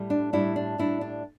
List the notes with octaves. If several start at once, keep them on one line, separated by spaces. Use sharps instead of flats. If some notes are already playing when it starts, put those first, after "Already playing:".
Already playing: A2 G3
D4
A2 G3 D4 E4
D4
A2 G3 D4 E4
D4